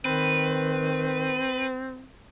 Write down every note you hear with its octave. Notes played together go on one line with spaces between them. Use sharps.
D#3 C4 B4